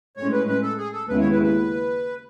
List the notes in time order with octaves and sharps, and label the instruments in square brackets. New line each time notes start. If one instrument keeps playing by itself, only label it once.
[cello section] A2 G#3 C#4 [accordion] C#5
[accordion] B4
B4
A4
G#4
A4
[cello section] D#2 C#3 G#3 B3 E4 [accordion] B4
[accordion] C#5
B4
B4